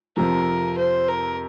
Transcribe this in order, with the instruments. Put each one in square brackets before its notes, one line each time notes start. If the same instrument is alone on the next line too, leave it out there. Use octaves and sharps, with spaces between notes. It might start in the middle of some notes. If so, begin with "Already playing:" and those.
[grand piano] F2 C3 F3 [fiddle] A#4
[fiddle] C5
A#4